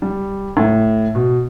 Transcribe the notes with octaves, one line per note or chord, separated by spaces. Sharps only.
G3
A2
B2